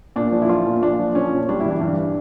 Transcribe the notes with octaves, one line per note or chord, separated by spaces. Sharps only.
A#2 D4
F3
E4
F3 F4
A#2
A#2 D4
F3
F3 C#4
A#2
G3 D4
E4
E3
D4
G2